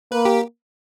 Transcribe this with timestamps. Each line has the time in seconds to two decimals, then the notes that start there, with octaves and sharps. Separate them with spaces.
0.11 A#3 B4
0.25 G4